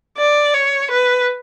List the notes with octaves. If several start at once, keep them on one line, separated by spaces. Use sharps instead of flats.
D5
C#5
B4